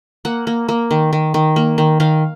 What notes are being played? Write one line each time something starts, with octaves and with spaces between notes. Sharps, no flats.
A#3 F#5
A#3
A#3
D#3
D#3
D#3
A#3
D#3
D#3 F5